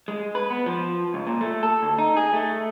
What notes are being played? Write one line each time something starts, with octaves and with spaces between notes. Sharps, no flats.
G#3
B4
B3
F3
C#2
A#2
A3
A4
D2
D#4
G#4
A3